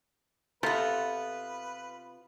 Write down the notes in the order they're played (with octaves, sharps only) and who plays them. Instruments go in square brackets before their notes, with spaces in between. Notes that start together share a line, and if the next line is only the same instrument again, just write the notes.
[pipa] C3 B3 [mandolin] F4 [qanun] A4 [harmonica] B4